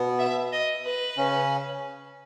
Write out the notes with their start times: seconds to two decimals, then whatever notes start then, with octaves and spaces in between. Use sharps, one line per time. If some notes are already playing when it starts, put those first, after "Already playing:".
Already playing: B2 B3
0.19 E5
0.52 D#5
0.85 B4
1.17 C#3 C#4